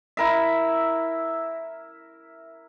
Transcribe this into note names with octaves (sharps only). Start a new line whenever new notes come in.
E4 A#4 E5